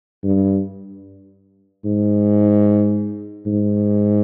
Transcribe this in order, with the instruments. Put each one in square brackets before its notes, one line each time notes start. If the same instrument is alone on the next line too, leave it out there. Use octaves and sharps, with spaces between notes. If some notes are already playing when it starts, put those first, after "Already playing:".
[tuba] G2
G#2
G#2